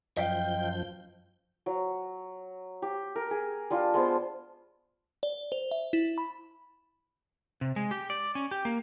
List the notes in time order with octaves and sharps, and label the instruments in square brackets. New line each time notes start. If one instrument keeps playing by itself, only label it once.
[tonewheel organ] F#2 F3 G6 [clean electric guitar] D#5 F5 G5
[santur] F#3
G4
A#4
G#4
G3 D4 F4
G#3 B3 C5 A5
[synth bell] D5
C5
E5
E4
B5
[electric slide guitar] C3
G#3
G4
D5
C#4
G4
A#3